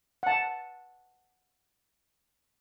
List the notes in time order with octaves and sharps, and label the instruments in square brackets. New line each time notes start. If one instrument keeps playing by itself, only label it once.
[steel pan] F#5 A5